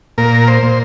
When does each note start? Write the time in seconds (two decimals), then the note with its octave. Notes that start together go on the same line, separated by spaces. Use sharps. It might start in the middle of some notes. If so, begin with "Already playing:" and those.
0.18 A#2 A#4
0.48 C5
0.63 A#2